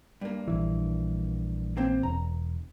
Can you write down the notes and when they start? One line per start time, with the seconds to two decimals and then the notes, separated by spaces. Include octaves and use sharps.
0.21 G2 A#3
0.48 A#1 E3
1.77 A#3 C4 C5
2.03 E1 A#5